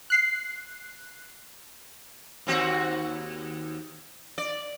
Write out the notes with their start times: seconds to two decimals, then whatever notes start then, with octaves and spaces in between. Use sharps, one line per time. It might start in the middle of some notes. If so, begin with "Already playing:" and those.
0.10 F#6 C7
2.47 D#2 C4 F#4
4.38 D5